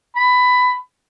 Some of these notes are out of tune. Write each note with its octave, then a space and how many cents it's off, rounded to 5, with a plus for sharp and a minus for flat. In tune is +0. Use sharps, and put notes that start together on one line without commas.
B5 +15